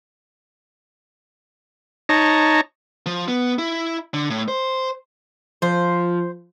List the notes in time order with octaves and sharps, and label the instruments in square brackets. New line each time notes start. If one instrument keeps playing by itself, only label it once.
[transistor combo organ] D#4 C#5 A5 A#5
[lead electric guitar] F3
B3
E4
D3
A2
C5
[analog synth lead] F3 [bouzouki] C5